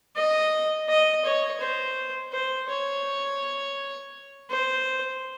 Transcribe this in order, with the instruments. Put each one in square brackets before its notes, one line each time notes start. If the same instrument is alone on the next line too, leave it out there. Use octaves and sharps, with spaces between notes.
[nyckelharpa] D#5
D#5
C#5
C5
C5
C#5
C5